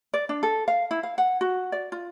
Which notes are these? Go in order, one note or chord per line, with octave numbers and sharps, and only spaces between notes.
D5
D4
A4
F5
E4
F5
F#5
F#4
D5
F4